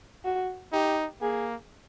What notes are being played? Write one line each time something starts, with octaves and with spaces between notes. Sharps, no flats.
F#4
D#4 G4
A#3 G#4